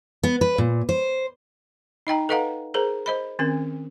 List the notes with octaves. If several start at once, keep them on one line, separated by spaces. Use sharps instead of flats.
B3
B4
A#2
C5
D#4 D#5 G5 A#5
A4 B4 D#5 F5 F#5 A#5
G#4 A#4 C5 A#5
C5 D#5 B5
D#3 C4 C#4 A#4